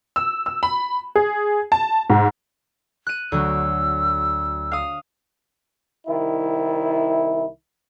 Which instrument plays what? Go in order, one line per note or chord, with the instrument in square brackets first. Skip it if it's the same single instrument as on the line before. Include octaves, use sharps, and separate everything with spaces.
[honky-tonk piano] E6
E6
B5
G#4
A5
G#2
[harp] F#6 D#7
[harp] D2 F#3 [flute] E6
[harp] F5 D#6
[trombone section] C2 D#3 E4